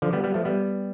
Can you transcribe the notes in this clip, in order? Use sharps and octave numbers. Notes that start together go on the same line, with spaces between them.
D3 F3
G3 B3
G3 B3
F3 A3
G3 B3